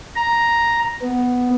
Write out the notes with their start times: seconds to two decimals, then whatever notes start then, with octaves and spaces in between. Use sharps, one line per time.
0.16 A#5
1.02 B3